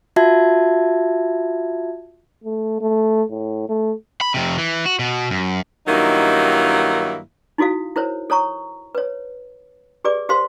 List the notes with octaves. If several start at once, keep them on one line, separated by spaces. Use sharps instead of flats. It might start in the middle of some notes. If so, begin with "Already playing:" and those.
F4 F#4 E5 A5 G#6
A3
A3
A2
A3
B5
F2 C3
E3
F#4
B2
F#2
G2 D#3 F#3 A#3 D#4 E4
D#4 E4 F#4 A4 F5
E4 A#4 C5 C#5
A4 C#5 A#5 C#6
B4 C#5
G4 G#4 B4 D5 D6
G4 A#4 C5 F5 C6